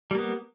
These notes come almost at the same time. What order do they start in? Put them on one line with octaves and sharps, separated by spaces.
G3 A#3 B3